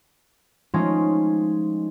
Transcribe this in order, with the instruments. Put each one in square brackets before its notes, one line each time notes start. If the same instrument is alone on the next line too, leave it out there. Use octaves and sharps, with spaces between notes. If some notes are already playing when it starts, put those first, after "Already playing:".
[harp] F3 G#3 A3 C#4 D#4 F4